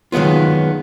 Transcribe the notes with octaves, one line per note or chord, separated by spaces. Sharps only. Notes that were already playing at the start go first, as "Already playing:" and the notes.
D#3 F#3 G#3 B3 F4